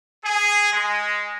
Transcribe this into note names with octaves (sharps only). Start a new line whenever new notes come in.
G#4
G#3